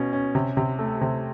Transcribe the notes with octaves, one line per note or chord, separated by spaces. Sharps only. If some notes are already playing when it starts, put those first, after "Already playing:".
Already playing: B2 C#4
C#4
C3
C3
A3
C3